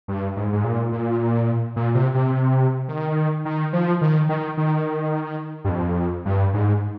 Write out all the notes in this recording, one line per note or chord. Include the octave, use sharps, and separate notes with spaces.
G2
G#2
G#2
A#2
A#2
A#2
C3
C3
D#3
D#3
F3
D#3
D#3
D#3
G2
F2
G2
G#2